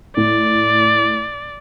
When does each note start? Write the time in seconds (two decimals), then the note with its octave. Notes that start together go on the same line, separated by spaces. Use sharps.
0.17 A2 D5